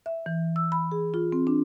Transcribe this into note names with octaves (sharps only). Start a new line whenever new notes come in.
E5
E3
E6
B5
G#4
F4
C4
D4